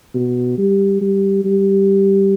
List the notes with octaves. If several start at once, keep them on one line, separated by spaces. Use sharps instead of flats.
B2
G3
G3
G3